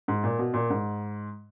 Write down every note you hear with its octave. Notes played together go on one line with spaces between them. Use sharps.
G#2
A#2
B2
A#2
G#2